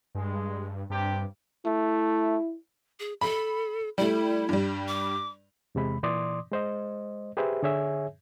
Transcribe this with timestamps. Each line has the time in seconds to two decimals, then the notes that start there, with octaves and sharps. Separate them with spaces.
0.15 G2 G#3
0.90 G2 C3 G4
1.66 A3 E4
3.00 G#4
3.21 A4 B5
3.98 G3 A3 E4
4.49 G2 G3
4.88 D6
5.75 E2 C3 G#3 B5
6.03 A#2 E3 D5 C6 D6 D#6
6.51 G#3 C5 D#5
7.37 G4 G#4 B4 C5 E5
7.63 D3 G#4 C#5 E5 G#5